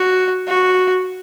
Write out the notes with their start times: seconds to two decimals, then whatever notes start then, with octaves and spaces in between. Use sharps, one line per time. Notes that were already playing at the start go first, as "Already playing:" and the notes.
Already playing: F#4
0.48 F#4